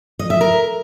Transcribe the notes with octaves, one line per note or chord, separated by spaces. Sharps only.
D#5
E5
A#4